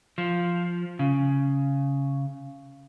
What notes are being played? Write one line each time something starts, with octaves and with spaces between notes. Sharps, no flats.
F3
C#3